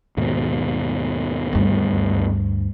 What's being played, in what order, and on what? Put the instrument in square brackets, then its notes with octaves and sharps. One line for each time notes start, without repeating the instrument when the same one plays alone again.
[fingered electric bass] D#2 G#2 B2
[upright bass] D2 G2